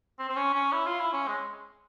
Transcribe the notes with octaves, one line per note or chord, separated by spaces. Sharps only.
C4
C4
C#4
C#4
E4
F4
E4
C#4
G#3